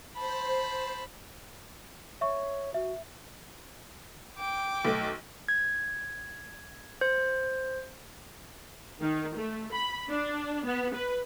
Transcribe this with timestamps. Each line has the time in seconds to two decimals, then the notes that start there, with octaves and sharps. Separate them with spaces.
0.15 C5 A5 B5
2.21 C#5 E5 C#6
2.74 F#4 E5
4.38 G5 D6
4.85 B1 A3
5.48 G#6
7.01 C5
9.02 D#3
9.35 A3
9.73 B5
10.09 D4
10.65 B3
10.94 B4